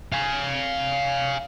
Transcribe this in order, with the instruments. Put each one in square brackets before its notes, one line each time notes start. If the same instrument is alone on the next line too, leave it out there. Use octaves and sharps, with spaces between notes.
[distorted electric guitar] F5 G#5